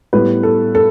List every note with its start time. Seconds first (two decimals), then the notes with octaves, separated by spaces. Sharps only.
0.13 A2 G3 B3 B4
0.43 A4
0.75 A4